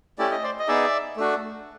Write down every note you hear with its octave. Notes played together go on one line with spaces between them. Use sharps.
A3 C#4 E4 G4 D5
D#5
C5 D5
D#5
B3 D#4 G#4 D5 E5
A3 D4 F#4